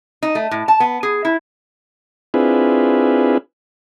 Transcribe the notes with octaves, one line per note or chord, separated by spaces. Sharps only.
D#4
A3
A2
A5
B3
G#4
E4
C4 D4 E4 F4 G#4 B4